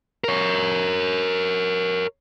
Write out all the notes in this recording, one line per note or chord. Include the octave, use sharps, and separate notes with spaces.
A#4 C#5